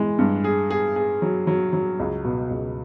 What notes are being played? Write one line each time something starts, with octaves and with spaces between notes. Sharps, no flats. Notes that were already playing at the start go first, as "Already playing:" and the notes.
Already playing: E3 G#3
G2
G#4
G#4
G#4
F#3
F#3
F#3
C#2
B2
C#2